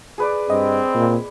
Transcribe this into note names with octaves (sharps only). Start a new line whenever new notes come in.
G#4 B4 D5
G2 C4 D#5
A#2